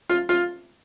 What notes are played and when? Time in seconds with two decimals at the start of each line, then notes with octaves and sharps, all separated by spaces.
0.10 F4
0.29 F4